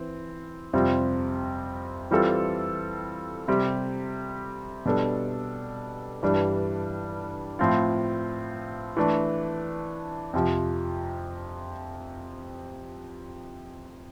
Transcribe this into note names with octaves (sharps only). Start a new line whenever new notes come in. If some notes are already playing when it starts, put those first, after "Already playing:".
Already playing: E3 C4
F2 C3 G3 C4 F4
E3 G3 C4 F4 A4
C3 G3 C4 G4
B2 G3 D4 A4
G2 E3 G3 D4
A2 F3 C4 F4
E3 A3 D4
F2 C3 F3